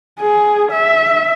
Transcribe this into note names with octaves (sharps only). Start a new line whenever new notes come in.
G#4
E5